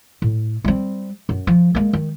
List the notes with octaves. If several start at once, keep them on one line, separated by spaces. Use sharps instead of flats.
A2
G3 C4
F#2
F3
G#3 A#3
D#3